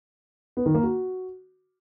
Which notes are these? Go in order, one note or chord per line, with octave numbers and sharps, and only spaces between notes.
B3
D#3
A#3
F#4